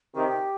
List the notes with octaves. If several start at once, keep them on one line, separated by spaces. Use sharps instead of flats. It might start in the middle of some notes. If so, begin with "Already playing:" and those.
C3 D#3 G4